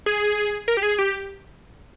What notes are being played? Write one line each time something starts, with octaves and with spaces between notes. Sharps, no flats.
G#4
A#4
G4
G#4
G4